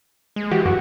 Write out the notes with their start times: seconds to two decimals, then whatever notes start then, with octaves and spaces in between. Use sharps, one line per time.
0.36 G#3
0.51 E3 F#4 G4
0.66 F#2 F#4